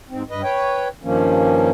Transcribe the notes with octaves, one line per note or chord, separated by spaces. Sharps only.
G#2 C4
G2 B4 D#5
B4 C#5 G5
G2 D#3 F3 A#3 C#4